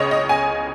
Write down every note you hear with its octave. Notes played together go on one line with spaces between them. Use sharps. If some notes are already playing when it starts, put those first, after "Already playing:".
Already playing: C#2 C#3 C#5 D#5
D#5
G#5